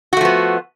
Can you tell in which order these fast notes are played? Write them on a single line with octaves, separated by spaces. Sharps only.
F#4 A3 F3 B3